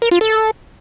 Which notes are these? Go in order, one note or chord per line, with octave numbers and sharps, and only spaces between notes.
A#4
F4
A4